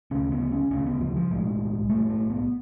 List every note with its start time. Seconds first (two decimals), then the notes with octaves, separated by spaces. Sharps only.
0.11 D2 C#3 C#4
0.32 B3
0.52 C#4
0.71 D2 C#3 C#4
0.87 B3
1.01 F3
1.16 F3
1.31 B1 A2 G#3
1.90 B1 A2 A3
2.10 A3
2.30 B3